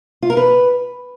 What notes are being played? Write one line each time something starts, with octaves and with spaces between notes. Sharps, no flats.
F4
A#4
B4